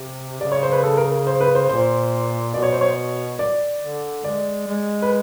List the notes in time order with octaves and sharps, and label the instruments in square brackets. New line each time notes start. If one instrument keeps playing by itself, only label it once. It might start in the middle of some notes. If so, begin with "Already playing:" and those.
Already playing: [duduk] C3
[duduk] C#3 [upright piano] D5
[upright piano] C#5
C5
B4
A4
A#4
C5
B4
C5
[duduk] A#2 [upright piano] C5
[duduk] B2 [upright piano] D5
[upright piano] C#5
C5
C#5
D5
[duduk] D3
[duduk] G#3 [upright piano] D5
[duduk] G#3
[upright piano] B4